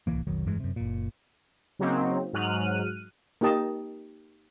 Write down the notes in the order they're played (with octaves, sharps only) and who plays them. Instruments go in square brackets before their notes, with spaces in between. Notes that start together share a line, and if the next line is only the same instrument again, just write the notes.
[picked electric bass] D1 C2 E3 A#3
F1 B1 D#3 F#3
F1 G2 E3 G#3
F#2 C3
F#1 A#2
[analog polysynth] C#3 F#3 A#3 C4 D#4
G#2 F#3 F6 F#6 D#7
[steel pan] A#3 D#4 G4 D#5 A5